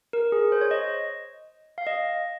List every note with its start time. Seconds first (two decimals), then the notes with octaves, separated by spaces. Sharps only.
0.13 A#4
0.32 G#4
0.52 C5
0.61 C#5
0.71 D#5
1.78 F5
1.87 D#5